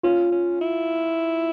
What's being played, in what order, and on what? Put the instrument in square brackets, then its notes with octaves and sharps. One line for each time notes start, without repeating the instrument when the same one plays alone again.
[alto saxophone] C#4 [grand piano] F4
[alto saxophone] C#4
E4